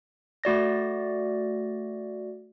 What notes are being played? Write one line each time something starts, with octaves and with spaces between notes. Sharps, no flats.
A3 F#4 D5 A#6